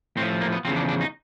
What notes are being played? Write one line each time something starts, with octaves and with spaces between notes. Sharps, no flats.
A2 F3 C4
A#3
B3
E2 C#3 F3 C4
D4
D4
D#4